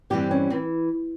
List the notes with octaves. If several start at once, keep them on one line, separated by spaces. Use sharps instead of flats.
G2 E3 G3 C4 G4
C#4
E3 C4